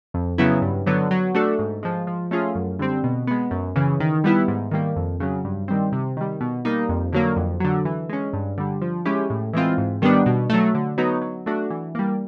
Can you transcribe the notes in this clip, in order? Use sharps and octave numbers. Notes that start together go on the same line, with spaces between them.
F2
C#3 F#3 B3 E4
G2
D3 F#3 B3
F#3
A3 D4 F#4 A4
G#2
F3 G#3
F3
A3 C#4 F4 G#4
F#2
D3 G3 C4
B2
G#3 B3
F#2
C#3 E3
D#3
G3 B3 E4
G#2
D#3 G3 A#3
F2
C#3 F#3
G2
D#3 G3 C4
C3
D#3 G3
B2
G3 A#3 D#4
F2
D3 F#3 A#3
F2
D3 F#3
E3
G#3 C#4
G2
D3 G3
F3
G#3 C#4 E4 G4
A2
E3 G#3 C4 F4
G#2
D#3 G3 B3 D4
B2
F#3 A3
D3
F#3 B3 D#4
F#3
A3 D4 F#4
E3
G3 A#3